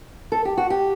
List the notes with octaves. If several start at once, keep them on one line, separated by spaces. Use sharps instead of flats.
A4
G4
F#4
G4